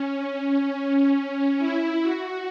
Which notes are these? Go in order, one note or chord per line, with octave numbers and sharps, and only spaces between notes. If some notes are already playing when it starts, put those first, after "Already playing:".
Already playing: C#4
E4
F#4